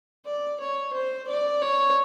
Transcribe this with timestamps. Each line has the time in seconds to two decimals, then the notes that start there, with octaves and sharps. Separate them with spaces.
0.25 D5
0.60 C#5
0.93 C5
1.27 D5
1.61 C#5